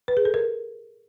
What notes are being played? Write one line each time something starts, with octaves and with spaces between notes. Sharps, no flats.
B4
G#4
A4
A#4